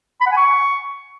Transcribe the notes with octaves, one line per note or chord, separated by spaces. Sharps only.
B5
F#5
G#5
C#6